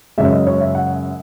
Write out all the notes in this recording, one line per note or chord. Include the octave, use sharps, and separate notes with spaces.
F#2 C#3 G#3 E5
D#5
C#5
E5
F#5